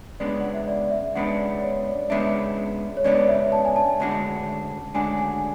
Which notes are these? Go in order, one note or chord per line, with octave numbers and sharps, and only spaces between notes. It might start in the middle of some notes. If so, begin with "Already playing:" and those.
C#3 G#3 B3 D4 D5
F#5
E5
D5
E5
C#3 G#3 B3 D4 F#5
D5
C#5
D5
C#3 G#3 B3 D4 E5
C#5
C#3 G#3 B3 D4 D5
E5
A5
G#5
A5
D2 C#3 G#3 D4 F#4
D2 C#3 G#3 D4 F#4 G#5
G#5